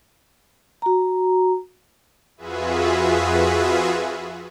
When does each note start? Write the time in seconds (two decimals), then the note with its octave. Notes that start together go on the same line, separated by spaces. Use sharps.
0.82 F#4 A#5
2.37 F2 F4 F#4 G#4 B4 E5